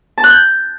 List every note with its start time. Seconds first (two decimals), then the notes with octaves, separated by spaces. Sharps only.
0.18 A5
0.24 F#6
0.30 G6